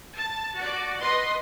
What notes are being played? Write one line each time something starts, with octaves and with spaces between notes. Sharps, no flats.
A5
F#4 D5
B4 D#5 C6